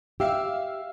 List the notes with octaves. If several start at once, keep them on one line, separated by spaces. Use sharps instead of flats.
G4 E5 F5 E6